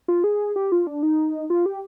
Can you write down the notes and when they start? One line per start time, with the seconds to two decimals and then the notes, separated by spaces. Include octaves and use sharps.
0.08 F4
0.24 G#4
0.56 G4
0.72 F4
0.87 D4
1.03 D#4
1.50 F4
1.66 G4